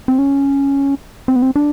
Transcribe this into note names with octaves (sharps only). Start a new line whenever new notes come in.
C4
C#4
C4
B3
C4
D4